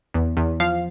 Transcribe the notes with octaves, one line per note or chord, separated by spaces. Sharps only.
E2
E2
F3 F5